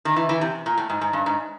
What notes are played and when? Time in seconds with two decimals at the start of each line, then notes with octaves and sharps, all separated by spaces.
0.05 D#3
0.16 E3
0.29 E3
0.41 C3
0.66 A#2
0.78 A2
0.90 G#2
1.01 G#2
1.13 G2
1.26 G#2